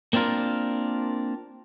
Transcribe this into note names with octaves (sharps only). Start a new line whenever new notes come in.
A#3 C4 D4 F4 A#4